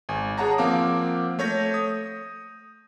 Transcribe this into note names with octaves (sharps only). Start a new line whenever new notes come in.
G#1 G#5
G#4 C#5 F#5 A5 A#5
F3 A#3 C4 F5 F#5 D6
A3 C#5 G6 A#6
D#6